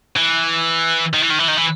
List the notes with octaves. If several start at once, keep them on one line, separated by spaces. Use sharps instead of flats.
E3
D#3
E3
D#3
E3
D#3
E3